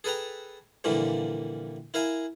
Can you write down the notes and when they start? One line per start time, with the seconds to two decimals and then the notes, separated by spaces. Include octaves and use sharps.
0.04 G#4 A4 B4 G5 A#5
0.84 A#2 D3 E3 F3 G3 A#3
1.94 E4 A#4 F5 G#5